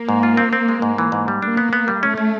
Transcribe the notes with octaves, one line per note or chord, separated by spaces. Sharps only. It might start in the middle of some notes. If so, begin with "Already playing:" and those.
Already playing: A#3
G#2
F4
C4
C4
G#3
G#2
E3
G#2
G3
A#3 D4
B3
B3
G3
A3 C#4
C#4